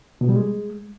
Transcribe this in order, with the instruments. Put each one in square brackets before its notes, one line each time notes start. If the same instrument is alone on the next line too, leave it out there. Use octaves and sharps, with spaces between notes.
[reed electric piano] B2
G3
G#3